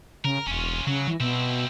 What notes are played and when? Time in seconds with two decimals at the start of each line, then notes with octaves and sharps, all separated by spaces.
0.25 C#3 A#4
0.47 E1 C#4 F4
0.87 C#3 F#3
1.08 E3
1.20 B2 C4 E4